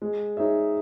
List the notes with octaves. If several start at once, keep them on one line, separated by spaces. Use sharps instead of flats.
G#3
D#4 G#4 C#5 E5